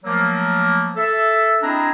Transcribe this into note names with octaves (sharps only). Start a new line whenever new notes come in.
F3 F#3 A3 A#3
A4 E5
C4 D4 E4 G#4 D#5 A#5